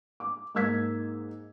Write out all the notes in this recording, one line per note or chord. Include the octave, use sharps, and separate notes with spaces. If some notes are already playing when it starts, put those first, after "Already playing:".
D6
G#2 A#3 D#4 E6 G#6 B6